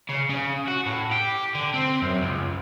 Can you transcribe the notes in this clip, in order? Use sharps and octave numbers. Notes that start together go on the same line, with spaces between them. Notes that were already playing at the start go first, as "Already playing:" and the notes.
C#3
C#3
F#4
A2
G4
D3
C4
F#2
C#2